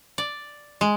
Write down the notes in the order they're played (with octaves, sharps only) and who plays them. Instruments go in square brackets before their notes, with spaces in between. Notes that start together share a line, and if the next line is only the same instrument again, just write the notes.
[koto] D5
G#3